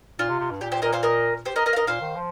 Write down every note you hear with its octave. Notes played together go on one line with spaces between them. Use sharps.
A#2 F4
C3
C3
G2
A#2 G4
G4 C5
A#2 A#4 D#5
C5 F5
A#4 D#5
G4 C5
A#4 D#5
A#4 D#5
F5
A#4 D#5
A#2 C5 F5
D#3
F3